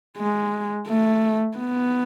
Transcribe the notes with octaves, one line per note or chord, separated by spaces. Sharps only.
G#3
A3
B3